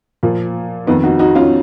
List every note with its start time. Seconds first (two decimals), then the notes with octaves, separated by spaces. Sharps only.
0.23 A#2 F3
0.87 F2 D#3 B3 D#4
1.03 D#4 F#4
1.19 D#4 F#4
1.35 C#4 F4